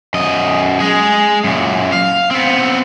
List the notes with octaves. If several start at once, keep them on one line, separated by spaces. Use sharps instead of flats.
F#2 D#5
G#3 G#4
F#2 A#2
F5
B3 C4